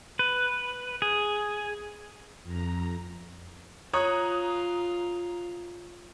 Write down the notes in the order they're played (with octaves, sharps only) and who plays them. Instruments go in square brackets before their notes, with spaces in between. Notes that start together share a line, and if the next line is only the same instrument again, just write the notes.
[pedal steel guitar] B4
G#4
[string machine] F2 A#5
[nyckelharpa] F4 [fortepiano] C#5 [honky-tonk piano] A#5 D#6 F#6